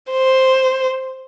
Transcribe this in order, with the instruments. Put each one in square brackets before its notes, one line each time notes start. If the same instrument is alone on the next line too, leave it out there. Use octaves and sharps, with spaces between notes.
[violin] C5